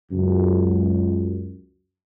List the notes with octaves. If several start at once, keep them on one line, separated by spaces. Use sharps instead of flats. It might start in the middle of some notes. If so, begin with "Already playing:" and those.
C#2 F#2